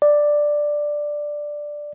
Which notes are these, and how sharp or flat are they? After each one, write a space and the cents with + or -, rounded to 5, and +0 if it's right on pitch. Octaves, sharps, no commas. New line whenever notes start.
D5 +5